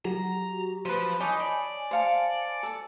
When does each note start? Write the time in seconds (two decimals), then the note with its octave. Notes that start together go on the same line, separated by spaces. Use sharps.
0.05 F#3 F#4 G4 A#5
0.85 F3 B4 C5
1.20 D#4 C#5 G#5 A5 B5 D6
1.40 D5
1.91 C5 F5 G#5 A5 C#7
2.63 A4 A5